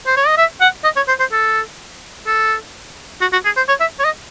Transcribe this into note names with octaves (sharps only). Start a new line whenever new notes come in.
C5
C#5
D#5
E5
F#5
D#5
C#5
C5
C5
A4
A4
F#4
F#4
G#4
C5
C#5
E5
C#5
D#5